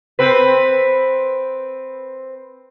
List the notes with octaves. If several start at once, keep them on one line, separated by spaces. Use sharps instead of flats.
C4 B4